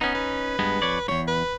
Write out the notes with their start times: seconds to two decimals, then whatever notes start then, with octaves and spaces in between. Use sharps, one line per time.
0.01 B3 C#4 D#4
0.15 B4
0.59 G2 G#3 B3
0.82 F2 C#5 D5
1.08 E2 G#2 C#5
1.27 B4